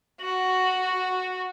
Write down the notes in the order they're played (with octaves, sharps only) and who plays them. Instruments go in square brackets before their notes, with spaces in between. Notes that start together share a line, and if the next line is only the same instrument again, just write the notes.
[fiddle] F#4